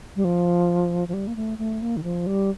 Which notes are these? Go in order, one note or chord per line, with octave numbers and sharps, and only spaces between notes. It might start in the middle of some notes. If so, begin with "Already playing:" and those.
G3
F3
F3
G3
A#3
A3
A3
A#3
D#3
F3
G3